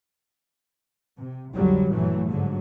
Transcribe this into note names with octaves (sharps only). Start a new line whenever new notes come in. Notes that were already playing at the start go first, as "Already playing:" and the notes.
C3
B1 F2 D3 F#3 G3
A#1 G2 E3 F#3 A3
G#2 D3 F#3